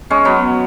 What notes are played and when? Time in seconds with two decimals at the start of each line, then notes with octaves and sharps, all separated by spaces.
0.10 G#3 C#4
0.25 F#3 B3